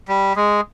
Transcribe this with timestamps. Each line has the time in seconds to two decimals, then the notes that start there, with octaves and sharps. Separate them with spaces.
0.08 G3
0.36 G#3